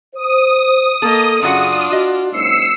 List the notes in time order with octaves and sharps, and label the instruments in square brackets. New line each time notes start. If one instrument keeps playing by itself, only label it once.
[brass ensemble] C5 [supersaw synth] D#6
[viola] A#3 D#5 [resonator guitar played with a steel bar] A4
[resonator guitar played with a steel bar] F#2 F#4 F#5 [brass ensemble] C#3 [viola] D4 F4
[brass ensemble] F#4 [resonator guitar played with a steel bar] D#5
[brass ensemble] F#1 G#2 [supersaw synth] E6 C7 C#7